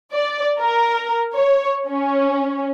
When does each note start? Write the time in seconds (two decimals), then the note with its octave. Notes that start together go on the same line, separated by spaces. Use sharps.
0.13 D5
0.59 A#4
1.34 C#5
1.88 C#4